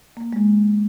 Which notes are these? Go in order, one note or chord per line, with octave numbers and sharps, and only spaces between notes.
A#3
G#3